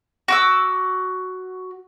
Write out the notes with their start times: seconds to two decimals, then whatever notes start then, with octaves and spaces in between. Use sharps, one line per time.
0.28 F#4 D6 E6